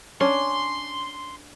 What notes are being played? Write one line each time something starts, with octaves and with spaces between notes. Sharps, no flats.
C#4 D4 C6